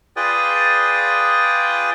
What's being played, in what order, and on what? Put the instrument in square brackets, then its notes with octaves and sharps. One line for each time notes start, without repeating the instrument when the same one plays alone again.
[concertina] F4 G#4 B4 D5 G5 D#6